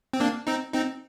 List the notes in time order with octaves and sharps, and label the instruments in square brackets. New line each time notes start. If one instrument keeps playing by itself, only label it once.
[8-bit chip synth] C4
A#3 D4
C4 D#4
C4 D#4